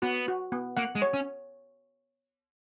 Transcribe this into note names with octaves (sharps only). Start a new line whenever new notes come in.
B3 F#4
F#4
B3
A#3 F#5
G#3
C#5
C#4